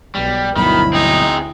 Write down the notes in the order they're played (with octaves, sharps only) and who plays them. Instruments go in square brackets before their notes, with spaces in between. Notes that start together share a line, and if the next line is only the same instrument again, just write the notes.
[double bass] B1 [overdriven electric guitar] G3
[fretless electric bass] G1 B2 F#3 [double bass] D2 E4 [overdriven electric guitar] D#3 [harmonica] B5
[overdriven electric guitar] C4 G#4 [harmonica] D#4